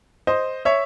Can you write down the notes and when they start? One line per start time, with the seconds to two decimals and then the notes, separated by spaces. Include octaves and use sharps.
0.27 C5 D#5
0.65 C#5 E5